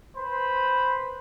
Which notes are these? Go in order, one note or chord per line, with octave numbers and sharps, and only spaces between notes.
B4 C5 B5